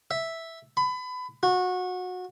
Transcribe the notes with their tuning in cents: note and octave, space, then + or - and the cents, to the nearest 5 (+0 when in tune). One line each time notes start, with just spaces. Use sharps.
E5 -5
B5 +25
F#4 -25